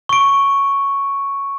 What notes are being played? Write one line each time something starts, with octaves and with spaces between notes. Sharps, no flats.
C#6 D7